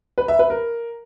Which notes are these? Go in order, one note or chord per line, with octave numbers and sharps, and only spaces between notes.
B4
E5
B4
A#4